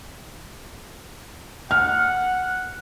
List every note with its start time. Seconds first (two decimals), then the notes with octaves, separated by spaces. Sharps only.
1.71 F#5 F6